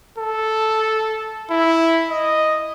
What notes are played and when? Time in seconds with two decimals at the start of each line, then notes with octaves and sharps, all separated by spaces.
0.18 A4
1.50 E4
2.10 D#5